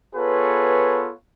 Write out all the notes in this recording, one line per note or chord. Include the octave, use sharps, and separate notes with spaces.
B3 F4 G#4 A4 B4 C#5